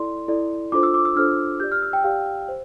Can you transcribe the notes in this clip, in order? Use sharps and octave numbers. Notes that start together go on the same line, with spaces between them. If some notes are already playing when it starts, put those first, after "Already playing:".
Already playing: E4 A4 D5 C6
E4 A4 D5
D4 F4 A4 C5 D6
E6
D6
E6
D4 F4 A4 C5 F6
G4 D5 G6
F6
E6
G5
G4 D5 F5
C5